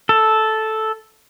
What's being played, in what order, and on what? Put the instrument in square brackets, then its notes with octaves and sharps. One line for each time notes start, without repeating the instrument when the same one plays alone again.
[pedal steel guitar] A4